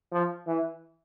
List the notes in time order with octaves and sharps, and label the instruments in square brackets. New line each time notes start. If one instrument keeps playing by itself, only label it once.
[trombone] F3
E3